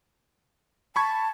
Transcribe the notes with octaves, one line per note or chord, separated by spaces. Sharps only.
A5 B5 C#6 G#6